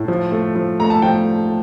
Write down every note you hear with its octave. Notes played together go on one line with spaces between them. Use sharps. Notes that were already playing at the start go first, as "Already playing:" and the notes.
Already playing: A2
F3
A3
F3
A3 A#5
A5
F3 G5